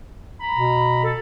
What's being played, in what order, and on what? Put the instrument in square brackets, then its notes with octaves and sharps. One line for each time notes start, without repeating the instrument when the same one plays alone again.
[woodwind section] A#5 B5
[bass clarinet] B2
[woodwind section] A4